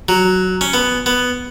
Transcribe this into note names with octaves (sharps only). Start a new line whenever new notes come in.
F#3
C#4
B3
B3